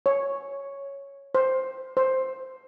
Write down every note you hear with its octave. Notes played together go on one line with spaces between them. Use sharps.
C#5
C5
C5